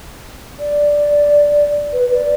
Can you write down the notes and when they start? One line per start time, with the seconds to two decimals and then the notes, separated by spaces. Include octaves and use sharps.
0.59 D5
1.93 B4
2.14 D5